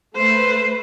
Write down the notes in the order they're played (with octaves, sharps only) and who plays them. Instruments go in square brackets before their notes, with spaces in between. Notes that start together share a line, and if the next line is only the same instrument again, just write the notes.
[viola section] A3 B4 [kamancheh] C5